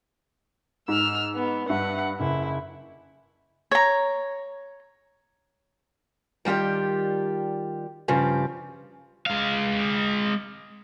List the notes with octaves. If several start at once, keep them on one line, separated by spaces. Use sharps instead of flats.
G#2 E6 F6
B3
G2 B4 E5 F#5
F#1 E4
C#5 A#5
D#3 G3 F4 G4 D5
G2 C#3 F3 G4
G#3 F5